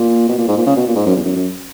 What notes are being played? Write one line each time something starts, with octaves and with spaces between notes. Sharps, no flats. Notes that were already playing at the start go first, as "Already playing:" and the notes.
Already playing: A#2
B2
A#2
G#2
A#2
C#3
B2
A#2
G#2
F#2
E2
F#2
F#2